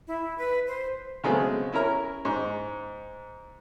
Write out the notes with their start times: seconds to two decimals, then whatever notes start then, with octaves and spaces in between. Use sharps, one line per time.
0.07 E4
0.38 B4
0.67 C5
1.24 C#3 F#3 G#3 A3 B3 C4
1.72 C#4 E4 A#4 A#5
2.25 G#2